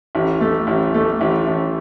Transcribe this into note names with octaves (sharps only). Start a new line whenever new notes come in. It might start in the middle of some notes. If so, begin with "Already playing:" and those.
A1
A3
A1
A3
A1
A1